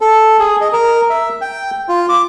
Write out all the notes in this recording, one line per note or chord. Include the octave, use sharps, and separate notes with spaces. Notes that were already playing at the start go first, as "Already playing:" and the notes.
A4
G#4
D#5
A#4
E5
G5
F4
D6